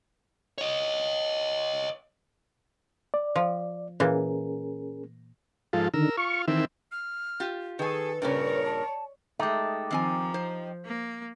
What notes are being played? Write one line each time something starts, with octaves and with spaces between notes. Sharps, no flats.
C#5 D#5
D5
F3
A#2 E3 C#4 G#4 A#4
G#2 F3 F4 A4
D3 D#3 A#4 E6
F4 C#6
D#3 E3 C4 E5
F6
F4 G4
D#3 G#4 A4 B4 G#5
G2 A#2 C#3 A#4 C#5 D5
A5
G#3 A3 D#4 G4
D#3 F3 C4 G#5
C5
A#3